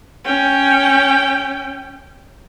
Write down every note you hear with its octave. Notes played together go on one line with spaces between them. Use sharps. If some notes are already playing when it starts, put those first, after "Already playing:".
C#4 G5